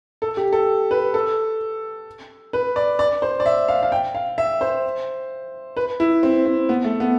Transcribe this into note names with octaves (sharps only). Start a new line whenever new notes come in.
A4
G4
A4
B4
A4
B4
D5
D5
C5
D5
E5
F5
F5
G5
F5
E5
C5
B4
E4
C4
C4
B3
A3
B3